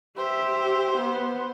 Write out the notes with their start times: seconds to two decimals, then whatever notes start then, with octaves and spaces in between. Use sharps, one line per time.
0.17 G4 C5 E5
0.97 B3